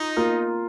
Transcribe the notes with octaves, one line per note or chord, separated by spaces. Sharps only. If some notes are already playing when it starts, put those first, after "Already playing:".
Already playing: D#4 F4
A#3 F4 A#4